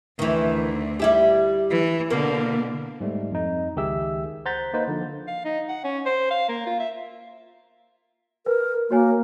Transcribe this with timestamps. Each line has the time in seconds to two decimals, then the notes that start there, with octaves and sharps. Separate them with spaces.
0.19 D2 D#3 E3
1.00 G3 E4 G4
1.70 E3
2.10 B2 D3 A#3
3.00 G#2 G3 A3
3.32 F2 D#4
3.76 C#2 D#3 G4 G#4 E5 E6
4.46 C5 F#5 A#5 G6 A6 B6
4.74 A#3 D#4 B4 C5
4.88 D3 F3
5.28 F5
5.44 D#4
5.68 F#5
5.84 C#4
6.05 C5
6.30 F5
6.49 A#3
6.66 F4
6.80 E5
8.46 A#4 B4
8.91 A#3 F#4 C#5 G#5